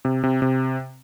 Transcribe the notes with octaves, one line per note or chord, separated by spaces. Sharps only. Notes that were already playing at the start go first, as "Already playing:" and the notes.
C3
C3
C3